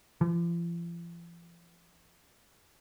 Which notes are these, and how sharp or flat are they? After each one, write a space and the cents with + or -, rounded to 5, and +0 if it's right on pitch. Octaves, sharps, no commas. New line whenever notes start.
F3 -40